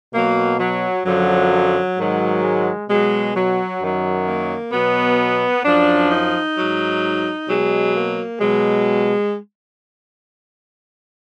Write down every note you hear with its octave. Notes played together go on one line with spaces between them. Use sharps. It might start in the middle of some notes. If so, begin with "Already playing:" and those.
B2 F#3 A#3
F#3
F#2 D3 F3 F#3
G#2 D#3 F#3
G#3
B2 F#3 G#3
F#3
F#2 D#3 F#3
A#3
B2 F#3 B3
F#2 F3 D4
D#4
G#2 F#3
B2 F#3 G#3
A#3
B2 F#3 G#3